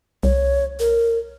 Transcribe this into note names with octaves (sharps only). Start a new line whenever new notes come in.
C2 C#5
A#4